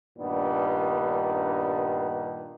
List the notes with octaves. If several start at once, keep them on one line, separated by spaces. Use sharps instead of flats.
G2 A#2 D#3 G3 B3 D4